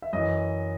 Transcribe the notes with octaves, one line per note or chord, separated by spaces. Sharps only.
E5
F#2 E3 D#5